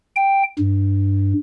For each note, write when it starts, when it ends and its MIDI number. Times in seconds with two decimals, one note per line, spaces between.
0.16 0.43 79
0.59 1.33 43